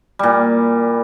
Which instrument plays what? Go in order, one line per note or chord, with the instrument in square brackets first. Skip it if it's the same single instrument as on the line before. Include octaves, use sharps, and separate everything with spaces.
[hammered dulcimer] A#2 G3